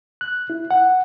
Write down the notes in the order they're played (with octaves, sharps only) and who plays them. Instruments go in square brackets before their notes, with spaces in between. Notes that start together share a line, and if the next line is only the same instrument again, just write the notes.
[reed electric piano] F#6
E4
F#5